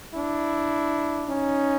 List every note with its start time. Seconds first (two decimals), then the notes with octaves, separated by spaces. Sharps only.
0.15 D4 E4
1.28 C#4 D#4